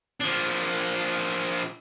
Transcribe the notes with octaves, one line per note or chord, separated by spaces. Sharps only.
F3 D4